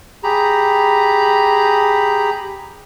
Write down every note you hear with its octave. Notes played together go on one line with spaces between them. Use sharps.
G4 G#4 A#5 B5